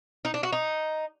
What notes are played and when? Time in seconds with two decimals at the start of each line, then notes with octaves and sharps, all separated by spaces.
0.25 D#4
0.34 D4
0.43 F#4
0.52 D#4